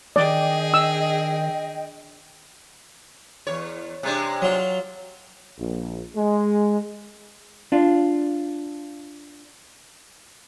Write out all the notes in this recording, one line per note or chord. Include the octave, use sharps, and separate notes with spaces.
D#3 D4 G#4 D5 D#5 G5
E6
E2 C#5
C3 G#3 D4
F#3 F4
A#1
G#3
D4 F4